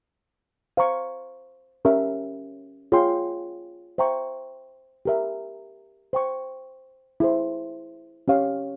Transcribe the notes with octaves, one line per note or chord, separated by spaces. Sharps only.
C5 F5 A#5 C#6
C#4 G4 A#4 E5
F4 G#4 C#5 G5 C6
C5 E5 G5 A#5 C#6
G4 A#4 E5
C5 G5 C#6
E4 G#4 C5
C#4 G4 C#5 F5